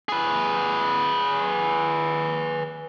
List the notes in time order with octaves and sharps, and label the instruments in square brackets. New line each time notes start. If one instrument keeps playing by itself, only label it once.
[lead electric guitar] G#4 B4